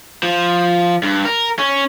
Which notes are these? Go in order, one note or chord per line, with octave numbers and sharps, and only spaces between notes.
F3
G2
A#4
C#4